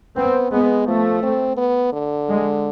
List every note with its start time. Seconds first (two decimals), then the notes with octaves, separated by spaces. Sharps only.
0.16 B3 C4
0.52 G#3 B3
0.87 F3 A3
1.23 C4
1.57 B3
1.93 D3
2.29 G#3